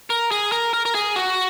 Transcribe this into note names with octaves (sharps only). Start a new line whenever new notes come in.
A#4
G#4
A#4
A#4
A#4
G#4
F#4